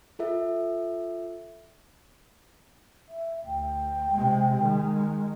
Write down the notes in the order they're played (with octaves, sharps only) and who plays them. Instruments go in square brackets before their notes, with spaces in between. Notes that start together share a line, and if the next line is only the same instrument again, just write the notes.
[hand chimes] F4 A4 E5
[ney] E5
[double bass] D2 [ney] G5
[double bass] C3 G#3
D#3 G#3